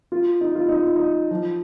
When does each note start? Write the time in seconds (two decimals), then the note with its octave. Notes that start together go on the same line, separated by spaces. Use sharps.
0.12 F4
0.41 D#4
0.55 F4
0.69 D#4
0.82 F4
0.96 D#4
1.31 F3